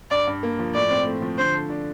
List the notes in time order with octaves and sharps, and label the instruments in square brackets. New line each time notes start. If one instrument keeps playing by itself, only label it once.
[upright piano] G2 [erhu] D5
[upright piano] G2
A#3
F3
[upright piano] A2 [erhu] D5
[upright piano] C4
A3
F3
[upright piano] D3 [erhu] C5
[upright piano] A4
D4